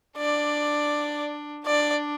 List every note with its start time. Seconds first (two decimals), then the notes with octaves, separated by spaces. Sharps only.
0.18 D4 D5
1.66 D4 D5